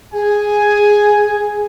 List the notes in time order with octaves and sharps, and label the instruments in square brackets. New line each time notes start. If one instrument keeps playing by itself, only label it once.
[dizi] G#4 [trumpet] G#5